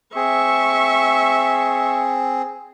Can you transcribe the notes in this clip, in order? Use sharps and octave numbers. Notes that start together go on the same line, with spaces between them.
C4 G#4 E5 C#6